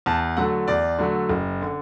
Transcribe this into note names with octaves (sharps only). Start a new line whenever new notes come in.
E2 A5
D3 F#3 A3 F#5
E2 D5
D3 F#3 A3
F#1
D3